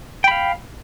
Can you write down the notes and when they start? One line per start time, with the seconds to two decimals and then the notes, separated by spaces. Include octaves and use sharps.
0.24 G5
0.28 B5
0.31 F5